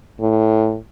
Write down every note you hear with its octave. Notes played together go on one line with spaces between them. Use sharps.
A2